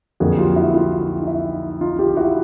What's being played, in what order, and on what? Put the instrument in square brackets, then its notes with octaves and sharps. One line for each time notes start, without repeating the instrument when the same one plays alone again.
[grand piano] F2 D3 F#3 A#3 F#4 G#4
F4 G4
E4 F#4
D#4 F4
D#4
E4
D#4 F4
F4 G4
E4 F#4